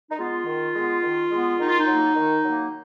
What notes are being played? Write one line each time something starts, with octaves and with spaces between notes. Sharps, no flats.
D#4
G#3 B3 F4
D#3
G#3 B3
D#3
G#3 B3
D#3 D#4
F4
D#4
F#3 A#3
D#3
F#3 A#3